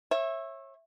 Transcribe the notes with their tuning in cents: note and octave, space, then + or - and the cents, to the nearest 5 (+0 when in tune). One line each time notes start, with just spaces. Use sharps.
C#5 -30 E5 +0